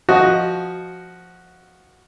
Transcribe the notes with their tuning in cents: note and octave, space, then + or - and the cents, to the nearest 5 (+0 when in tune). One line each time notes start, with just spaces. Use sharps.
F3 +0 F#4 +0 D#5 +0